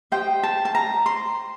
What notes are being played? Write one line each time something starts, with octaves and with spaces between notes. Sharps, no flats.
G4 C5 D#5 G5
A5
A5
A#5
C6